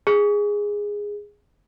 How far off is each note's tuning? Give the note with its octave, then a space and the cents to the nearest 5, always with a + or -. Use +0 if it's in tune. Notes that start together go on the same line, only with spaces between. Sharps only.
G#4 -10